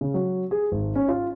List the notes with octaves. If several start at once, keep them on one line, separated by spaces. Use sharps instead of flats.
C#3
F#3
G#4
G#1
C#4
F4